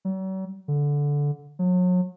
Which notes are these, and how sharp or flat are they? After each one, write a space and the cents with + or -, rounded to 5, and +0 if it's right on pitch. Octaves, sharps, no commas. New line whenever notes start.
F#3 +45
D3 -15
F#3 -35